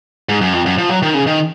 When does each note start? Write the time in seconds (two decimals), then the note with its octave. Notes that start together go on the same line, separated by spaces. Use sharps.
0.29 G#2
0.41 F#2
0.53 F2
0.66 F#2
0.78 F3
0.89 F#3
1.03 D#3
1.14 C#3
1.27 D#3